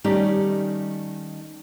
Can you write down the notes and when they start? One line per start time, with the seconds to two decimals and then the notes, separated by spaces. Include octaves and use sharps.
0.04 D#3 G3 A3 C#4 D#4 G4